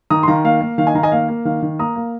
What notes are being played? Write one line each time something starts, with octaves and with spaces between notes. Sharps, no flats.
D#3 A#5 D#6
C6
D#3 F5 A#5
A#3 F5
A#3
D#3 F5
D#5 G#5
D#3 F5 A#5
D#5 G#5
A#3 F5
A#3
D#3 F5
D#3
A#3 A#5 D#6
A#3